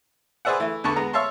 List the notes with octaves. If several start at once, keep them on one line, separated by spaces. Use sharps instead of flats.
G#4 B4 C5 D5 E5 F#5
E3 A3
E2 D3 B4 A5 C#6
G#3 B3 A#5
C#5 E5 F5 A5 C6